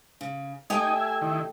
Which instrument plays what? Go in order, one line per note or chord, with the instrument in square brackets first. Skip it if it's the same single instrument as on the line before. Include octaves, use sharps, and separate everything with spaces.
[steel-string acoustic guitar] C#3
[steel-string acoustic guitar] A3 G4 G5 [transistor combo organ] D#4 D#5 G#5
[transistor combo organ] E5 G#5
D#3 E4